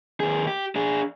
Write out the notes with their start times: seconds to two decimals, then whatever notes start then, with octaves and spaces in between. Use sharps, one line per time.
0.20 D#2 G#4
0.47 G4
0.76 D4 G#4